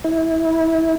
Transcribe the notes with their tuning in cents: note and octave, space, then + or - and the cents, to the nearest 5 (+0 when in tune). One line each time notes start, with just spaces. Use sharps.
E4 -25